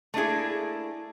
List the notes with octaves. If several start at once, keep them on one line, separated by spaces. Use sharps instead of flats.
A3 A#3 D4 E4 G#4